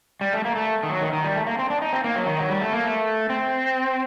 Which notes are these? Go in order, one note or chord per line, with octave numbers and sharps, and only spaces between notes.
G3
A3
A#3
A3
D#3
F#3
D#3
D#3
G3
A3
A#3
C4
D4
D#4
C4
A#3
F#3
D#3
F#3
G3
A3
A#3
A3
C4